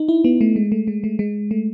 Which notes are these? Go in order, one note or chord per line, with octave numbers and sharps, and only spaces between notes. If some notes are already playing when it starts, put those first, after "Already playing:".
Already playing: D#4
E4
B3
A3
G#3
A3
G#3
A3
G#3
A3